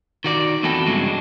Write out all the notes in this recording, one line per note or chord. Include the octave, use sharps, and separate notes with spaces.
D#3 F#4 D5
F2 E3 B3 F#4 A4 G5
E2 G2 C#3 F#3 G#3 F#4
D4